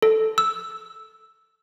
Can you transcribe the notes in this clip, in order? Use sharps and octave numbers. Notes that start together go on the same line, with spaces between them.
A4
E6